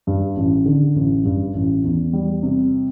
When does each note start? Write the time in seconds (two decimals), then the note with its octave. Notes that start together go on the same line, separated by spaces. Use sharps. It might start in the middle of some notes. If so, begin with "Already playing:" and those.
0.07 G2
0.36 A1
0.66 D3
0.96 A1
1.25 G2
1.54 A1
1.84 E2
2.13 G3
2.43 C3